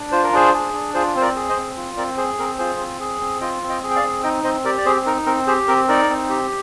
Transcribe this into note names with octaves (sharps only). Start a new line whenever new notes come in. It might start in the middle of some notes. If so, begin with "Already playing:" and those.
Already playing: D4
F4 C5
A#4
D4 G#4 C5
G#4
D4
F4 G#4 C5
C4 C5
A#4 D5
G#4
C5 D#5
C4
F4
C4 A#4 D5
G#4 C5
C4 A#4
F4 G#4 C5
C4
G#4
C4
F4 D#5 G5
C4
D#5 G5
G#4
G5
D5 F5
C4
D#4 D#5 G5
C4 C5 D#5
G4 A#4 D5
D5
C4 G#4 C5
D#4 A#4
C4 A#4
G4 G#4 C5
C4 A#4
D#4 A#4 D5
C4
G4